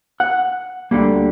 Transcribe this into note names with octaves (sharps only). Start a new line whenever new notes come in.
F#5
D2 D3 G3 A#3